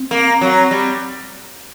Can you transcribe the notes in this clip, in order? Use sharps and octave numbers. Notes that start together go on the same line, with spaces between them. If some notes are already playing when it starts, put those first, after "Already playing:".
Already playing: C4
A#3
F#3
G3